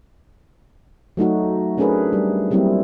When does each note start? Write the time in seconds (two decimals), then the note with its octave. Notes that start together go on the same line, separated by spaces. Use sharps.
1.17 F#3 A3 D#4 F#4
1.78 A3 C#4 D4 G#4 A#4 B4
2.13 G3
2.51 F#3 G3 A#3 C4 E4